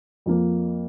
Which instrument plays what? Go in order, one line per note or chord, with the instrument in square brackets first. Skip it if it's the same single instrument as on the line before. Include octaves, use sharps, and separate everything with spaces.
[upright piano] F2 F3 A#3